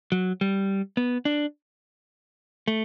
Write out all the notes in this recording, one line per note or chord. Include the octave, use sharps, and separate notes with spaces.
F#3
G3
B3
D4
A3